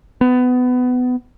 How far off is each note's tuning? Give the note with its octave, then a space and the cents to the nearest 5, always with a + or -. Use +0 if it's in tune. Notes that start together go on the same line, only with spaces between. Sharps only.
B3 +20